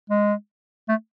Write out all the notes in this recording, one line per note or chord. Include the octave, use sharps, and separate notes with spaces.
G#3
A3